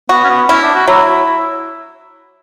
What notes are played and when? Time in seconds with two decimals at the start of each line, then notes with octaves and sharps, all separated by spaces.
0.09 B3 F#4
0.24 C#4
0.30 B3
0.49 C#4 E4
0.62 D4
0.74 F#4
0.88 F#3 E4